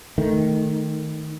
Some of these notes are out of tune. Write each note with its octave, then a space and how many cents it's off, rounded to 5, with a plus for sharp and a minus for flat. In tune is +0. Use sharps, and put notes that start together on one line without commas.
D#3 +0 A3 +0